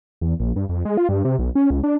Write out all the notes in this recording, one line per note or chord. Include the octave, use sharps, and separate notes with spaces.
E2
A#1
G2
F2
G#3
F4
G2
C3
B1
C#4
C#2
D4